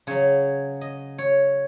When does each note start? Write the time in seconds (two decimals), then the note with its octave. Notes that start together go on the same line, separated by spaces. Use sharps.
0.07 C#3 F#3 C#5
0.81 D#5
1.18 C#5